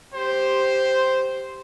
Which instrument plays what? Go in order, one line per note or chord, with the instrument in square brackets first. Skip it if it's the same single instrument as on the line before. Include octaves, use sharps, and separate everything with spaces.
[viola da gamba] G4 [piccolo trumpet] C5